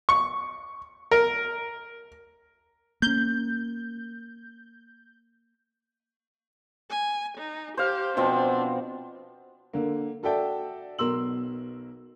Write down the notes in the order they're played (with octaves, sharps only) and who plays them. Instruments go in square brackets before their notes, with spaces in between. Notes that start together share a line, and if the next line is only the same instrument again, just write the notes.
[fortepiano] C#6
A#4
[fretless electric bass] A#3 C#4 [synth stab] G6
[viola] G#5
D#4
[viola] G4 [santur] C5 F5
[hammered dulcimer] B2 F3 C4 [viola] D4
[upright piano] D3 A#3
F#4 A4 D5 E5 G5 A5
B1 B2 A#4 C6 E6 F#7